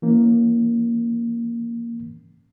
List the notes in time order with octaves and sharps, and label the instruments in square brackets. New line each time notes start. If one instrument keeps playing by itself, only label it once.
[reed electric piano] E3 A#3 C#4